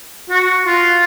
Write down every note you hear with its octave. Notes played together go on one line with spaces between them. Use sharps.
F#4
F4